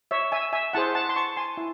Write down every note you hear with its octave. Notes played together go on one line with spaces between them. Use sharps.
C#5 E5
E5 G#5
E5 G#5
E4 G#4 C5 F#5 A5
F#5 A5
C6
A5 C#6
G#5 C6
E4